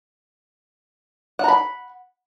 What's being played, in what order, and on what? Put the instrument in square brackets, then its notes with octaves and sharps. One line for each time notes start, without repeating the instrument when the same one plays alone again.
[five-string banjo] F#5
A#5
B5